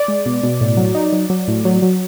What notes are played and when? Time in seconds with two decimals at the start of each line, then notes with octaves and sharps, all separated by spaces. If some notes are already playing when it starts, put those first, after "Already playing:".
Already playing: D5
0.08 G#3
0.26 B2
0.43 B2
0.61 A2
0.77 F#3
0.95 D#4
1.13 F#3
1.30 F#3
1.48 A2
1.65 F#3
1.82 F#3